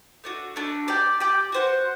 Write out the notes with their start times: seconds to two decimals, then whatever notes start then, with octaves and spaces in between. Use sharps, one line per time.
0.24 A3 D4 F#4
0.56 A3 D4 F#4
0.88 G4 D5 G5
1.20 G4 D5 G5
1.52 F#4 C5 F#5